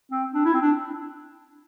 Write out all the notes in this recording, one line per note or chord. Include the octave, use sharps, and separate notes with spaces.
C4
D4
E4
C4
D4